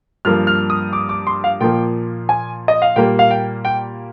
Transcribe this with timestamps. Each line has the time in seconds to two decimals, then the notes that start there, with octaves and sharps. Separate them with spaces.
0.25 G2 F3 A#3 F6
0.47 F6
0.70 D#6
0.93 D6
1.09 D6
1.27 C6
1.44 F5
1.60 A#2 F3 A#3 G5
2.29 G#5
2.68 D#5
2.82 F5
2.96 A#2 G3 A#3 G5
3.19 F5
3.31 G5
3.65 G5